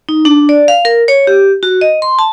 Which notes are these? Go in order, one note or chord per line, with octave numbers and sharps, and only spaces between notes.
D#4
D4
D5
F5
A#4
C#5
G4
F#4
D#5
C6
A5